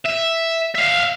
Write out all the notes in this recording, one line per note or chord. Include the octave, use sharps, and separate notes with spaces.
E5
E5 F5